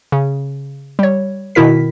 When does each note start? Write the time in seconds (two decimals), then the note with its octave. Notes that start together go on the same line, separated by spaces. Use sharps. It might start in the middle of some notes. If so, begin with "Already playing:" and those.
0.12 C#3
0.99 G3 C#5
1.55 B2 D#3 E4 A#4 B6